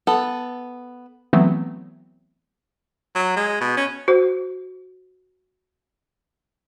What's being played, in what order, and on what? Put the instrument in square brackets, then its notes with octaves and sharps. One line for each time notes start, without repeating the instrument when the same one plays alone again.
[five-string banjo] B3 A4
[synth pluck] E3 F#3 A3 B3 C4
[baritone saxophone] F#3
G#3
B2
C#4
[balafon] F#4 C5